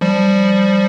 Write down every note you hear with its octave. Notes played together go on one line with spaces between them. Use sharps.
F3 G3